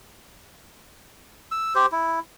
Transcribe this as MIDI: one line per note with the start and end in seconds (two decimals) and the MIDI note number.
1.52 1.74 88
1.75 1.86 67
1.75 1.86 72
1.92 2.19 64